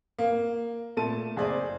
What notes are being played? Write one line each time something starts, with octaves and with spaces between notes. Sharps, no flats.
A#3
A#2 A3 A5 D#7
F#1 G#4 C5 D5